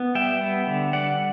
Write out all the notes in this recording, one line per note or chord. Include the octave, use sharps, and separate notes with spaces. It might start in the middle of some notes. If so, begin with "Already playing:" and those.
Already playing: B3
G3 E5 G5
B3
D3
G3 D5 F#5